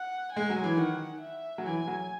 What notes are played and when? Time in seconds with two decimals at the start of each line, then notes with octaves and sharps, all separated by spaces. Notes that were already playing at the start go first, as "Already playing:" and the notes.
Already playing: F#5
0.33 G#3 G#5
0.50 F#3
0.64 E3
0.77 D#3 F#5
1.21 E5
1.58 F#3
1.65 E3 G#5
1.87 F#3